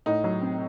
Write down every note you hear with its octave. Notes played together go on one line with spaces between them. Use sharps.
A2 D#4
F#3
C4